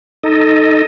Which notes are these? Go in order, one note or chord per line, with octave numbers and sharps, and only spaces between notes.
D#4 A4 D#5